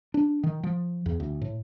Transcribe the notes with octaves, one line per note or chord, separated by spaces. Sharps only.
D4
D#3
F3
E2
D2
A2